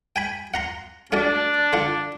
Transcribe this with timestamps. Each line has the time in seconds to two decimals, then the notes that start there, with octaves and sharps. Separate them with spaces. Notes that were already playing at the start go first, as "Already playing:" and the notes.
0.16 G5 G#5 B5
0.54 F#5 A#5 C6
1.12 A3 D4 F#4 D5
1.73 D3 F4 F#5